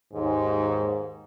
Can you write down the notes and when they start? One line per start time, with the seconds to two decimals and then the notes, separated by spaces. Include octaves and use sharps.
0.14 D#2 G#2